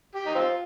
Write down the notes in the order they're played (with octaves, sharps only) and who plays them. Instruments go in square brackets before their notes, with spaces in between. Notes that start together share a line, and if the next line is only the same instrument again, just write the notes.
[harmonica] G4
D#4
C4 F4